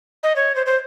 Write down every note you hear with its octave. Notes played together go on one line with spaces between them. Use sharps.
D#5
C#5
C5
C5